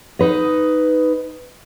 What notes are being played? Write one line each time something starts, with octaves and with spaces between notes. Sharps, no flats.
D#4 B4 D#5